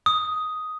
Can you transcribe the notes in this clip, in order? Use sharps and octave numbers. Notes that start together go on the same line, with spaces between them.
D#6